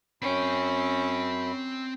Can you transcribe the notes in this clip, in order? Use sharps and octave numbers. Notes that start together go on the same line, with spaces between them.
F#2 C4 C#4 G5 B5